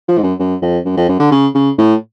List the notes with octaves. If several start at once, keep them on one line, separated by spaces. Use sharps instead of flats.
F3
G#2
F#2
F#2
F2
F#2
F2
F#2
D3
C#3
C#3
A2